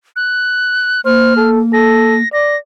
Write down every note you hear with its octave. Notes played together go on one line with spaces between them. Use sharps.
F#6
A#3 C5 F6
A4
A4 A#6
D5 A#6